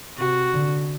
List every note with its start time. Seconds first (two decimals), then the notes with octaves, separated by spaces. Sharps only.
0.17 C3 F#4
0.54 D3